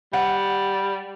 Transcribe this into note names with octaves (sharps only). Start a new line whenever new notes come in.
G3 F#5